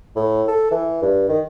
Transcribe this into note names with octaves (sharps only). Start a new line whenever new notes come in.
A2
A4
E3
G2
D#3